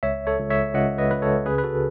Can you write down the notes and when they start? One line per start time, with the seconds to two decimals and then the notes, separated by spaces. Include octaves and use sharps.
0.03 C#2 C#5 E5
0.27 A4 C#5
0.38 C#2
0.50 C#5 E5
0.74 C#2 D#5 F#5
0.98 B4 D#5
1.10 C#2 B4
1.22 A4 C#5
1.46 C#3 G#4 B4
1.58 B4
1.64 F#4 A4